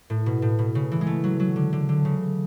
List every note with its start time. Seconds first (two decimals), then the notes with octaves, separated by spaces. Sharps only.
0.10 A2
0.26 B2
0.42 A2
0.59 B2
0.75 C#3
0.92 E3
1.01 G#3
1.07 A3
1.24 F#3
1.40 F#3
1.56 D3
1.73 D3
1.89 D3
2.05 C#3